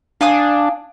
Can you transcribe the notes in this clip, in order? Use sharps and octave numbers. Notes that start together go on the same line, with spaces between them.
D4 F5 G#5 D#6